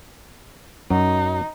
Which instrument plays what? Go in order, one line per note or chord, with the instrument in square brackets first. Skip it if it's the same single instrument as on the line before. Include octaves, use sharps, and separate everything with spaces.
[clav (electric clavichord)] F#2 F#3 [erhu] D#4